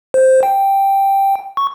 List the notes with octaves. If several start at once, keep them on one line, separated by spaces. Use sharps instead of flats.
C5
G5
C#6